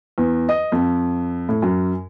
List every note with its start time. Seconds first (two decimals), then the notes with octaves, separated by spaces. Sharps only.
0.18 E2
0.49 D#5
0.72 F2
1.49 A2
1.62 F#2